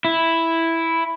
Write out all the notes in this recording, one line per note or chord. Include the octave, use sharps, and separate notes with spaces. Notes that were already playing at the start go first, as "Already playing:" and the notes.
E4